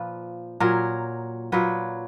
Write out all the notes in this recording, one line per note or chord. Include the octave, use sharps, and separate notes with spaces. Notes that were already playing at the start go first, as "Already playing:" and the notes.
Already playing: A#2 F3 B4
A#2 F#3 A#4
A#2 F#3 B4